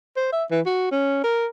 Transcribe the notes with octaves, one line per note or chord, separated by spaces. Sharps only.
C5
E5
E3
F#4
C#4
A#4